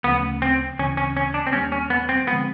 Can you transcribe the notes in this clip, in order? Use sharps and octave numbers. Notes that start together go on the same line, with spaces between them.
D2 C#3 F3 A3 B3 C#4
C4
D2 C#3 E3 C#4
C#4
C#4
D4
C4
D#2 D#3 G3 A#3 C#4
C#4
B3
C4
D3 F3 G#3 B3 C4 F4